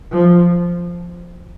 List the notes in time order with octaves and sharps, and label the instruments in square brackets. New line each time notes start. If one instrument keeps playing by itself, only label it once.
[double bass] F3